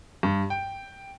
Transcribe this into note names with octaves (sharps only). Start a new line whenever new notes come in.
G2
G5